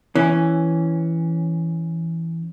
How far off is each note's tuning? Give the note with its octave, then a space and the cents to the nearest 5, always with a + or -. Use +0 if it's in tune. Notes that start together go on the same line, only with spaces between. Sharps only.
E3 +0 C#4 +0